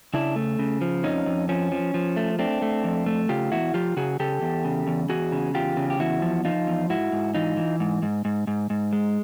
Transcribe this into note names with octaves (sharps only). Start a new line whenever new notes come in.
C#3 D4 E4
A3
C#3
F3
F2 C#4 D#4
F2
F3 C#4
F3
F3
A3
A3 C4 D4
A3
F2
A3
C#3 F4 G4
E2 E4 F#4
F3 F4 G4
C#3 F#4 G#4
C#3 G4 A4
E2
C#3
E2
E2 F#4 G#4
C#3
E2 F4 G4
C#3
G4
E2 E4 F#4
F3
F3 D#4 F4
E2
G#2 E4 F#4
G#2
E3 D#4 F4
E3
G#2
G#2
G#2
G#2
G#2
G#3